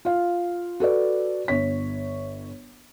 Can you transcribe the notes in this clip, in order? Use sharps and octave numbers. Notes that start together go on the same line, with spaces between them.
F4 F5
F#4 A4 B4 D5
G1 C#5 B6